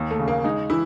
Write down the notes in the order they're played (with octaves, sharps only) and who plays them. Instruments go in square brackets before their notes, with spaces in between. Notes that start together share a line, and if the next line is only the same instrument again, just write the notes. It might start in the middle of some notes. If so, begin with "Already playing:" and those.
Already playing: [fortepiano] D#2
[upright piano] A3
[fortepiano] C#3
[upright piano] A#3
[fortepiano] G#3 [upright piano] D#4
[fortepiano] E3 [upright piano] E4